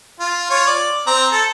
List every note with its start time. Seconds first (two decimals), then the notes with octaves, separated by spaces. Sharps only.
0.20 F4
0.50 F4 C#5
0.66 D5
1.07 C4 A#5
1.32 A4